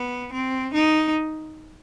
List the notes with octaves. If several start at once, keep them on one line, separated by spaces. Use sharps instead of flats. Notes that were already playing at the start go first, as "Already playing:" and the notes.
Already playing: B3
C4
D#4